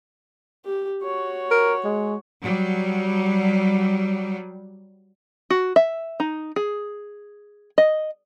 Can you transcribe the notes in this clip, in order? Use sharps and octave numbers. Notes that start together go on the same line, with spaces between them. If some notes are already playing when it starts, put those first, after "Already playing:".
G4
F#4 C#5
A#4
G#3
F#3 G3
F#4
E5
D#4
G#4
D#5